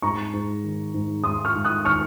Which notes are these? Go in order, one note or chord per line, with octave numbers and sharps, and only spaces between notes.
G#2 A#5 C#6
G#2
D#3
G#2
G#2 C6 D#6
C#6 F6
G#2
D#6 F#6
D#3 C#6 F6